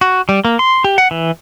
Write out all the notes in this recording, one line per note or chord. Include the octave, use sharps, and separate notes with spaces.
F#4
G3
A#3
C6
G4
F#5
E3